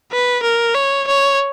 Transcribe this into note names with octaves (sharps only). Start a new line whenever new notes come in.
B4
A#4
C#5
C#5